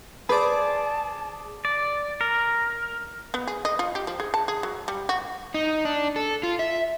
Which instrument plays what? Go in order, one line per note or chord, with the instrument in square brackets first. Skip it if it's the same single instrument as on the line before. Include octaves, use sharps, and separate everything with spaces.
[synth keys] G#4 D6 [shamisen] B4 [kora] C5 D5 [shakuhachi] A5
[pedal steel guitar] D5
A#4
[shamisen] B3
G#4
D#5
F4
G4
F3
G#4
A5
G#4
F#3
G3
F#4
[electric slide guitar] D#4
D4
A4
F4
E5